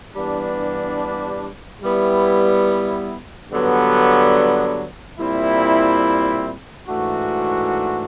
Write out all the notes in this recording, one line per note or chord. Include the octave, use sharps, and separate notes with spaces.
G2 E3 G3 B3 D4
G3 B3 E4
G2 D3 F#3 B3 D4
A#2 G3 C4 E4
G#2 E3 A3 D4 F#4